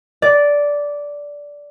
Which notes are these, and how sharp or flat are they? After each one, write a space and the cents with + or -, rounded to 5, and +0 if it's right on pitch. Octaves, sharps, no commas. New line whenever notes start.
D5 -10